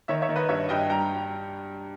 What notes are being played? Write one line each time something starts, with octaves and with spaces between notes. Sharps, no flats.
D#3 C#5 E5
C#5 E5
D#3
B4 D#5
G2 C#5 E5
G2 D#5 G5
G3 G5 A#5